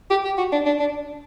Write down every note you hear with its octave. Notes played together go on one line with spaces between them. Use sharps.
G4
G4
F#4
D4
D4
D4